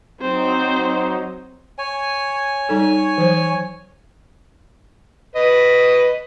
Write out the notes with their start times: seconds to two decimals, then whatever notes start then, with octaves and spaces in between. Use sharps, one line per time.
0.21 F#3 C4 D#4 C5
1.78 C#5 G#5
2.69 G3 D#4 A4
3.18 E3 F#3 C5
5.36 B4 D#5